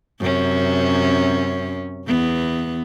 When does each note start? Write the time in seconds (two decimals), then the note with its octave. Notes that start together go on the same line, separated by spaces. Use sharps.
0.20 F#2 C3 C#4
2.07 E2 B3